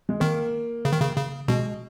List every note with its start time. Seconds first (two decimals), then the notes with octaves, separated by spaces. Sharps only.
0.09 G#3
0.20 D#3 A#3
0.85 C#3
0.92 D#3
1.01 C#3
1.16 C#3
1.48 B2 G#3